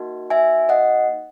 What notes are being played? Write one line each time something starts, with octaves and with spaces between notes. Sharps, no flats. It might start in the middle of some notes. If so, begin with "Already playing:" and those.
Already playing: A#3 D#4 F#4
E5 G#5
D#5 F#5